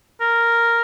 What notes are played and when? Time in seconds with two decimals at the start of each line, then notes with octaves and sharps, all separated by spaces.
0.21 A#4